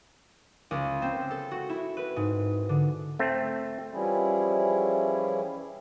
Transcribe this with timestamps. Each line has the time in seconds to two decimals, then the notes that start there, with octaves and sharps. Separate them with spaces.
0.71 C#2
1.02 C4
1.31 A4
1.51 F#4
1.69 E4
1.97 B4
2.16 G#2
2.69 D3
3.19 A3 C4
3.91 E3 F3 G3 C#4 E4 G#4